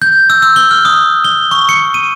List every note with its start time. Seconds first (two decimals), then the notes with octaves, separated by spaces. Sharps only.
0.02 G6
0.30 E6
0.42 E6
0.56 G7
0.71 F6
0.85 D#6
1.24 G7
1.51 C#6
1.69 C#7
1.94 D#7